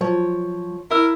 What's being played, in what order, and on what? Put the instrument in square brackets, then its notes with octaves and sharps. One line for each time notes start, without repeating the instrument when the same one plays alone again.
[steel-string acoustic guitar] F3 C#5 [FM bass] F#3
[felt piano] E4 E6 [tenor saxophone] A#4